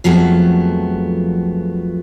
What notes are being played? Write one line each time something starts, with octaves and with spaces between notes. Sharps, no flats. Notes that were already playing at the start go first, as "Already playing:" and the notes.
F2 F3 F#3 A3 B3 G#4